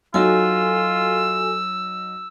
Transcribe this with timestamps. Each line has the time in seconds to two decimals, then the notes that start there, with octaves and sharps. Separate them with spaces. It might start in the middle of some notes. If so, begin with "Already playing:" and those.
0.14 F#3 D#4 F4 F#4 A4 G#5 E6